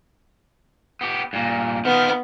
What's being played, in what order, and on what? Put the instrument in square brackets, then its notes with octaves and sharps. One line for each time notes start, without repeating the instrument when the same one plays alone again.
[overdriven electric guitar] B3 G4
G2 A#2
[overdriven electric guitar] D#3 F4 [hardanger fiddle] B3